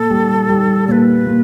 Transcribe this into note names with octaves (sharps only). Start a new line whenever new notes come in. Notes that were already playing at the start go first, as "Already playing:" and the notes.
Already playing: A#2 A4
G3
G3
A#2 B4 D5
A#2